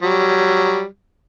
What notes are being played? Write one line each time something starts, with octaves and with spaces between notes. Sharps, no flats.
F#3 G3